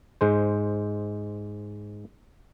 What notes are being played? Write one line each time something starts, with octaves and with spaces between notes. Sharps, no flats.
G#2 G#3 C5